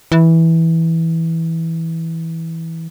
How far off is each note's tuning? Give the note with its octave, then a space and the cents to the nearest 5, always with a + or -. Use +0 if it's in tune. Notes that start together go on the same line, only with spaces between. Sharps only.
E3 -10